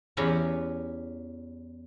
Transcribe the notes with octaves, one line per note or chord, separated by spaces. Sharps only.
E2 C#4 G4 B4 A#5